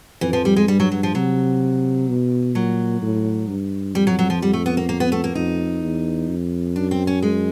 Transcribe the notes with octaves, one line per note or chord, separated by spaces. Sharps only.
F2 E3
F3
G3
G#3
G2 G3
F#3
F#3
F3
C3 F#3
B2
A#2 F#3
A2
G2
F2 G3
F#3
F#3
F3
G3
A3
B3
A#3
A#3
B3
A3
A#3
F2 D#4
E2
F2
F#2 D4
C4
C#4
G#3